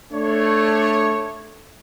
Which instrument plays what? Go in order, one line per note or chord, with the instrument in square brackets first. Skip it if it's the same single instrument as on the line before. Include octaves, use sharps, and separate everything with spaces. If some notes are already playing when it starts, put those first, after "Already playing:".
[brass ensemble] A3 D4 C#5